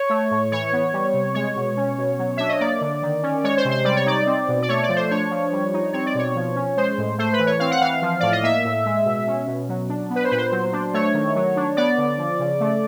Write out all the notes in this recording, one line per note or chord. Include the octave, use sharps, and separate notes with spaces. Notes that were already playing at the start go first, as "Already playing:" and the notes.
Already playing: C#5
A3
A2
E3 C#5
B3
G3
C3
G#3 C#5
B2
C#4
B2
F#3
D4 E5
D#5
A#3 D5
D3
D#3
C#4
G#3 C#5
C5
C3
C5
G3 D5
C#5
D#4 D5
C4
B2
D5
A3 C#5
D5
F3
C5
D4 C#5
F3
G3
D#4
C4 C#5
D5
B2 C#5
F3
C#4
G#3 C5
A2
A3 C5
B4
E3
C#5
C4 F5
F#5
E3 F5
F3
A2 D5
D#5
A#3 E5
A2
G#3
B2
C#4
B2
F#3
D4
B3
B4
C5
A#2 B4
C5
F#3
D4
A3 C#5
D#3
F#3
D4
B3 D5
D3
F3
C#3
A3